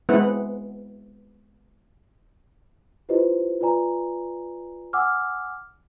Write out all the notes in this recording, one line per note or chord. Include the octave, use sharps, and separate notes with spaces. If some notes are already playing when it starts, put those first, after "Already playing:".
G#3 B3 C4 E4 B4 F#5
E4 F4 G4 B4 C5 D#5
F4 B4 D5 G#5 A#5
F#5 G#5 D6 E6 F6